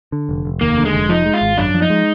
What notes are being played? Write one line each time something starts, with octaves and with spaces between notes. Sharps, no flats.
D3
F1
F1
D#2 A#3
D3
G#3
F1
F3 D#4
G#3
F4
G#1
F#2 D4
F3
D#4
G#3